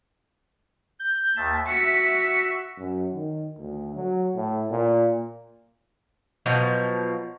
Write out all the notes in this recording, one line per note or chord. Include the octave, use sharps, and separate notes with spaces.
G6
D#2 E5 A5
F#4 E5 B6 C#7
F#2
D#3
D2
F#3
A2
A#2
B2 F3 F#3